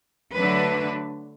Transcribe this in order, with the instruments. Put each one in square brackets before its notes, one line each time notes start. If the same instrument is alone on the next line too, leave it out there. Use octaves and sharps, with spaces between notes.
[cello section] D3 F#3 A3 D4 B4